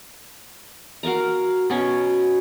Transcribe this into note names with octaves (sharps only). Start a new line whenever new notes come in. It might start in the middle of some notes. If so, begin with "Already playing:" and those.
F#4 A#4 F5 A#5
B2 C#4 C#5 C#6